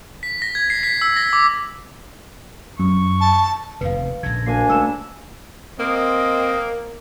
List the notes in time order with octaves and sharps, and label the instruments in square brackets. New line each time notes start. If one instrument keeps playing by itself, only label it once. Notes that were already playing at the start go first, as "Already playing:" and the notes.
[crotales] B6
A#6
G#6
C7
B6
E6
A#6
D6
[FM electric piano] F#2 [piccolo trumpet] C#6
[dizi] A5
[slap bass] F1 D#2 B2 [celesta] B4 F5
[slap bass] A#1 C#3 [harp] A4 A#6 [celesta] G#6
[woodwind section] D2 A#3 D4 [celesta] A#4 C7 [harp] G#5 C6
[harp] C#2 [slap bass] A3 [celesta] E6 E7
[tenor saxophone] A#3 [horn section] C4 D#5